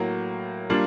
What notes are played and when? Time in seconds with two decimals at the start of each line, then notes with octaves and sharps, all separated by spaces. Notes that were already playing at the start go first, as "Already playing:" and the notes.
Already playing: A2 F#3 A#3
0.70 G3 A#3 D4 F4